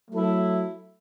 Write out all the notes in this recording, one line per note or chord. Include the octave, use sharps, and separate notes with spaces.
F#3 A3 E4 A4